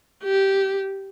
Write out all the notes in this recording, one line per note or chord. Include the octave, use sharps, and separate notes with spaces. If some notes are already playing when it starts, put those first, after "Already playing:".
G4